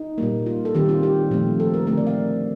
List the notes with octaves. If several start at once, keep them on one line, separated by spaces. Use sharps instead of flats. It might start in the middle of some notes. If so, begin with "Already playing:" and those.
Already playing: D#4
A#2 G3 A#3
F4
A4
D#3 G3 C4 G4
F4
G4
A#2 F3 A3 C4
A4
A#4
D3 A3 C4 A#4
D5
F5